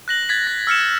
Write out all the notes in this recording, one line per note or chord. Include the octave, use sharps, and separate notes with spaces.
F#6 A#6 F#7
G#6 A6 B6
A#6
E6 F6 C#7 E7